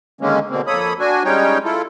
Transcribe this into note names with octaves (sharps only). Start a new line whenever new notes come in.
D3 D#3 G#3 A#3 C#4
B2 D3 A#3 C4
F2 A#3 A4 C#5 B5 D#6
D4 F#4 G#5
G3 G#3 C#4 D#4 C#5 G5
E4 F4 A4